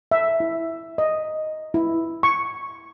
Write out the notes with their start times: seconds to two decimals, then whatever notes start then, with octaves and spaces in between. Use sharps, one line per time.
0.11 E5
0.40 E4
0.98 D#5
1.74 E4
2.23 C#6